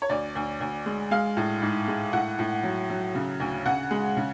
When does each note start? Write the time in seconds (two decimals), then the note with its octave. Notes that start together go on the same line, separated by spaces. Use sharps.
0.02 C#5
0.09 D2 D5
0.35 D2
0.60 D2
0.86 G#3
1.11 G#3 F5
1.37 A2
1.62 G#2
1.88 G#3
2.13 A2 F#5
2.39 A2
2.63 F#3
2.90 F#3
3.15 C#3
3.40 D2
3.66 C#3 F#5
3.91 G#3
4.17 C#3